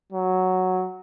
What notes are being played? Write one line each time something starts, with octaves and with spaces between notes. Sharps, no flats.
F#3